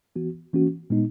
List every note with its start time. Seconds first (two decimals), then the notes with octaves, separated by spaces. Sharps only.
0.16 E3 B3 F#4
0.53 E3 A#3 C#4 F#4
0.90 A#2 G#3 B3 D#4